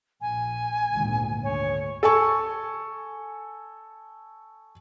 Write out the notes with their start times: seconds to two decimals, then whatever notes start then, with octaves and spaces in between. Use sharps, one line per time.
0.21 A#1 G#5
0.93 G#1 D2 A#2
1.44 D2 C#5
2.03 A4 G#5 C#6